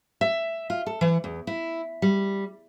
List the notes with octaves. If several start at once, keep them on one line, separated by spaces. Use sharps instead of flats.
E5
F4
A4
E3
E2
E4
G3